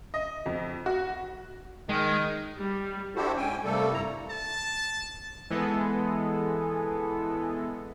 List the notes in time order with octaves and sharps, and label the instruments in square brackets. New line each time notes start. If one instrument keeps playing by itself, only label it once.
[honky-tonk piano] D#5
F2
F#4
[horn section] D#3 [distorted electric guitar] G#3
[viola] G3
[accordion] D4 E4 F#4 G4 A4 C5
G#2 C#4 G5 G#5
C3 G3 A3 A#3 A4
G2 E4 A#5
[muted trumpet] A5
[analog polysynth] E3 G#3 B3 A4